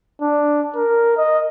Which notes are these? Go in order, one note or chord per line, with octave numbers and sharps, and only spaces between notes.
D4
A#4
D#5